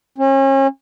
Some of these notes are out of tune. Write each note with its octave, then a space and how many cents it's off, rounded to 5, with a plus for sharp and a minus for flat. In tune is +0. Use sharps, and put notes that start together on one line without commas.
C#4 -35